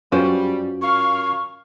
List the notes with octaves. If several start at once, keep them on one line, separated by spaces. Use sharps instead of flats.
F#2 G3 C#4 F4 F#4 B4 C5
A#4 C#5 F5 C#6